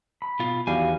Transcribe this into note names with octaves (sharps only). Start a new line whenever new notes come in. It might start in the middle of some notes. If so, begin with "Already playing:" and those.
B5
B2 F4
E2 D#3 G3 F#4 B4 F5 G#5